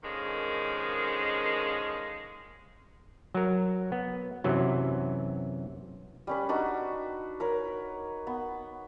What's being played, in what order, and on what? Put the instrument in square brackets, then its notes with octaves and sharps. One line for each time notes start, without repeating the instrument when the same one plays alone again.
[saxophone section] D3 D#3 F3 G#3 A#3 C#4
[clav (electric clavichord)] F#3 A#4
B3
F#2 C3 E3 F#3
[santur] G3 C#4 B4
D4 D#4 F#4 B4
A#4 B4 C#5
B3